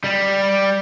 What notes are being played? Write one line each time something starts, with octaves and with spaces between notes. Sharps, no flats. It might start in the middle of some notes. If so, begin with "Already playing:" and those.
G3